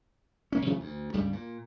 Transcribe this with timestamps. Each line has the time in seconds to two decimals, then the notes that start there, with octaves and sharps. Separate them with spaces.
0.52 B1 A#3 C#4
0.67 C3 E3 F#3 A3
0.80 D2
1.13 C#2 G2 C#3 G3
1.33 A#2